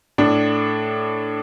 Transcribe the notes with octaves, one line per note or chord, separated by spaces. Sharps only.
A2 D4